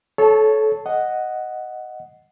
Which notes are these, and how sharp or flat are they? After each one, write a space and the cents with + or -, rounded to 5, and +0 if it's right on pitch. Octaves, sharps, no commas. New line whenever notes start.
A4 -25 C#5 +0 A5 +0
D#5 +0 F#5 +0